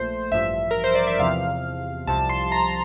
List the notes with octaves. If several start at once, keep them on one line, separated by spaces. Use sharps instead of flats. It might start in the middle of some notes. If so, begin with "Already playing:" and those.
Already playing: A#1 A#2 A3 C5
A1 G2 F3 E5
A#4
C5
D5
E5
E2 C3 F3 F5
C2 C3 F3 A5
C6
A#5